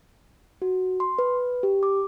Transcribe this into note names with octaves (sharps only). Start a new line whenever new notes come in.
F#4
C6
B4
G4
D6